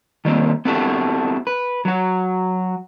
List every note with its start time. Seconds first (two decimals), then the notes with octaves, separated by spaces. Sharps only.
0.25 D#3 G3 A#3 C4
0.65 B3 C4 E4 F#4 G4 A4
1.47 B4
1.85 F#3 F#4